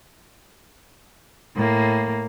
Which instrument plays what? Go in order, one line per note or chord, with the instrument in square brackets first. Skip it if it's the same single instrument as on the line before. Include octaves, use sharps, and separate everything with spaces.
[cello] A2 A#3